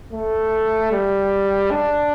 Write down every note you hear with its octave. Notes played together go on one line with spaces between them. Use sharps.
A3
G3
D4